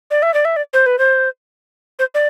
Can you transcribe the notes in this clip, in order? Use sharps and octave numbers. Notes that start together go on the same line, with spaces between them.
D5
E5
D5
E5
D5
C5
B4
C5
C5
D5